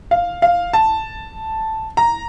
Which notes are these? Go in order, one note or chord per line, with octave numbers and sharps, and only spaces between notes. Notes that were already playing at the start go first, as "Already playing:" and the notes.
F5
F5
A5
A#5